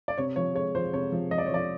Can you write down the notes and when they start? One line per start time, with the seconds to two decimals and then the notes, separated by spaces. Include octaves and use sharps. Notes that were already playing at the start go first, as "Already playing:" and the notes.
0.08 D5
0.18 C3 C#5
0.36 F3 C#5
0.55 G#3 C#5
0.75 F3 C5
0.93 C3 C#5
1.12 F3
1.31 F3 D#5
1.38 D5
1.46 C#5
1.50 F3 D5